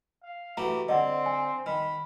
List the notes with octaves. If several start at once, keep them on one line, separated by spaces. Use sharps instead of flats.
F5
E3 A3 F#4 G4 A#5
D3 C4 D#5 F#5
G#5
D#3 B5 F6